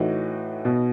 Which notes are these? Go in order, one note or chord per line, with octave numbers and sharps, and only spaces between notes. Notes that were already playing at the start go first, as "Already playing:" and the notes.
Already playing: A2 E3 D#4 F#4
B2